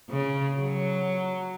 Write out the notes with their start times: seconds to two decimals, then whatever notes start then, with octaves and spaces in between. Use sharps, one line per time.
0.10 C#3
0.61 F#3